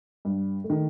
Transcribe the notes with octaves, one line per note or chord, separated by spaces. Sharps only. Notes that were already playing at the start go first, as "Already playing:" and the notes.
G2
A3
D#3